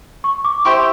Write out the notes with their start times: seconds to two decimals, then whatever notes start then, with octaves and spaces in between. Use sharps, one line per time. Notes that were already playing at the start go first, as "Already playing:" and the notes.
0.24 C#6
0.45 D6
0.65 E4 G4 C5 E5 C#6